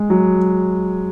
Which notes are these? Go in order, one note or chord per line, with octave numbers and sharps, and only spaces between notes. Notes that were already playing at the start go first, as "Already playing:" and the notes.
Already playing: G#3
F#3